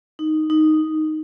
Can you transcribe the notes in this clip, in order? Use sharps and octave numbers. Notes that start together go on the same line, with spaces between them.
D#4
D#4